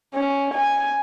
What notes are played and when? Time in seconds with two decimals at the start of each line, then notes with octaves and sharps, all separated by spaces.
0.14 C#4
0.54 G#5